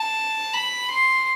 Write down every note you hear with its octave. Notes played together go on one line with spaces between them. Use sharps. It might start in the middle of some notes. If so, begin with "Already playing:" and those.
Already playing: A5
B5
C6